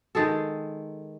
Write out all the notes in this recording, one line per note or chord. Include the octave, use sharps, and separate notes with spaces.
D#3 G#3 G#4 A4